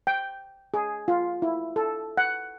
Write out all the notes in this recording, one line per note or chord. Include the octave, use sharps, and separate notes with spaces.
G5
G#4
F4
E4
A4
F#5